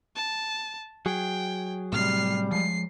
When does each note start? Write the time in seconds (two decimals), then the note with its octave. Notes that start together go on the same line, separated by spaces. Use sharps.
0.15 A5
1.06 F#3 G#4 G5
1.93 A2 C3 G3 F6 C7
2.52 F3 G#3 C7